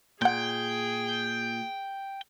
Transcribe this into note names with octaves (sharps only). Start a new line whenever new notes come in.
A#2 G#4 F#5 G5 G6